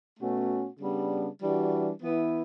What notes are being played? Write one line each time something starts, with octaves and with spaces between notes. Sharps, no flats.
B2 A3 C#4 F#4
C#3 G3 B3 D4
E3 G3 D4 F#4
E3 B3 E4